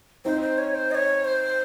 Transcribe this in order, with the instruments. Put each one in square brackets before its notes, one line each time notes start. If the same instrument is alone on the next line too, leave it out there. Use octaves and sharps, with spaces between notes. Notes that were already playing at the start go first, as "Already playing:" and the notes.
[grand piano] C4 D#4 [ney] C5
[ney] C5
C#5
C5
D#5
C#5
C5